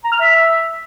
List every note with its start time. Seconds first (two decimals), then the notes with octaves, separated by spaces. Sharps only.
0.04 A#5
0.12 F6
0.20 E5